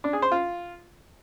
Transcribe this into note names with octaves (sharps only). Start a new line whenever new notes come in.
D4
G#4
C5
F4